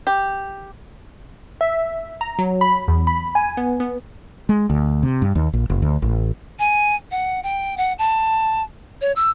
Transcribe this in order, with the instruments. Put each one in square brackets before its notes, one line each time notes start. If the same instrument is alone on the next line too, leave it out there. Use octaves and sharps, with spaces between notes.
[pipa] G4
[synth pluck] E5
A#5
F#3
B5
E2
B5
G#5
B3
B3
[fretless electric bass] G#3
D2
C3
G2
D#2
A#1
F#1
D2
A1
[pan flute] G#5
F#5
G5
F#5
A5
C#5
E6